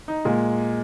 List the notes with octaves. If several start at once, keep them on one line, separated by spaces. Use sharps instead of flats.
D#4
A#2 G#3